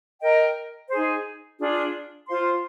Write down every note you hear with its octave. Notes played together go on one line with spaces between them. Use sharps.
A#4 D#5 G5
D#4 G#4 C5
D4 F4 G#4
F4 C5 F5 C6